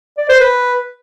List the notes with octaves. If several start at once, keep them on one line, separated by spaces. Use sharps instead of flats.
D5
C5
B4